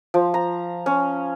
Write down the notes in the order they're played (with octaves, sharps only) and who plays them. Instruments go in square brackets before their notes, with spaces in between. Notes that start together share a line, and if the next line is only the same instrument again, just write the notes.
[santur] F3
A#5
C#4